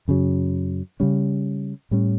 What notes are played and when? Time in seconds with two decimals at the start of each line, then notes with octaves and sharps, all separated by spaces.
0.08 F#2 C#3 F#3
1.00 C#3 G3 C#4
1.91 A2 G3 C#4